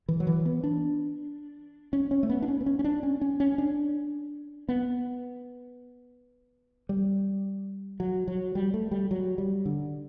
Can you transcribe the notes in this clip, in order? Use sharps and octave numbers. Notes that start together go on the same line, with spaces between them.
E3
F#3
E3
B3
D4
C#4
C#4
A3
B3
D4
C#4
B3
C#4
C#4
D4
C#4
C#4
C#4
D4
B3
G3
F#3
F#3
G3
A3
G3
F#3
G3
D3